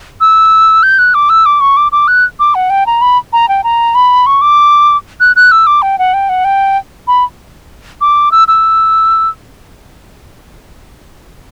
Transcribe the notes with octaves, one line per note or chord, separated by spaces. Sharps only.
E6
G6
F#6
D6
E6
D6
C#6
D6
D6
F#6
D6
F#5
G5
A#5
B5
A#5
G5
A#5
B5
C#6
D6
F#6
F#6
E6
D6
G5
F#5
G5
F#5
G5
B5
D6
E6
E6